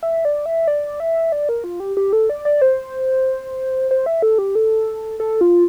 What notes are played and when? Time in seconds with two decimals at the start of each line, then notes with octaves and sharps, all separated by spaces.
0.03 E5
0.25 D5
0.46 E5
0.67 D5
1.00 E5
1.32 D5
1.49 A#4
1.64 F4
1.80 G4
1.97 G4
2.13 A4
2.30 D5
2.45 D5
2.62 C5
3.91 C5
4.06 E5
4.22 A4
4.38 G4
4.55 A4
5.20 A4
5.41 F4